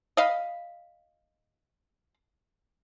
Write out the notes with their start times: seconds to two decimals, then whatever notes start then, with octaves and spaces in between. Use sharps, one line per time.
0.17 D#5 F5 B5